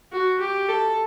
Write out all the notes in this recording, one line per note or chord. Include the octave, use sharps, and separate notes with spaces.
F#4
G4
A4